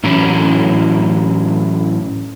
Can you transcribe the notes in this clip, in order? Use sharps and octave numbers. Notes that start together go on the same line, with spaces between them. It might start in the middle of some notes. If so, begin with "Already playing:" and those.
A2 E3 F#3 C#4 E4